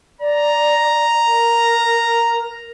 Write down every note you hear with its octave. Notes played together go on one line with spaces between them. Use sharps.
D5 A#5
A#4